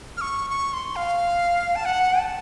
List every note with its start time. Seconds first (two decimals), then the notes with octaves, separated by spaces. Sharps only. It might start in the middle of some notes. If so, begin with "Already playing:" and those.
0.17 F6
0.21 C#6
0.50 C#6
0.73 C6
0.96 F5
1.76 A5
1.85 F#5
2.19 A5